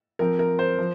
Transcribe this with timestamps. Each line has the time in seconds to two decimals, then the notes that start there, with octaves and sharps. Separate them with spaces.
0.19 F3 C4 A#4
0.39 A#4
0.59 C5
0.79 F3